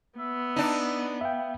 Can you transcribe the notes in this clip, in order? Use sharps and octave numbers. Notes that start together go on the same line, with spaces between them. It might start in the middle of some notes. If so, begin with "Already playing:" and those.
B3 E5
D4 D#4
E5 F5 G5